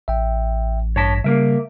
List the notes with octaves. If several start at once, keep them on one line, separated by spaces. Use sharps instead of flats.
A1 E5 G5
G2 C#5 A5 A#6 B6
C#3 G3 A#3 A#4 E5